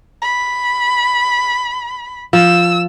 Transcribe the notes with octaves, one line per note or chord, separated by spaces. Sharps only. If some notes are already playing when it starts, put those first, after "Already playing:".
B5
F3 E6